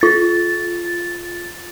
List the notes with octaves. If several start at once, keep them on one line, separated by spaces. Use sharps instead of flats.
F4 A6